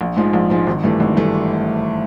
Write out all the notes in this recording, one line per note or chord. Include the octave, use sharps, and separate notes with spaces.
A#1
G#2 F3 G#3
A#1
G#2 F3 G#3
G#1
G2 E3 A3
G#1
G2 E3 A3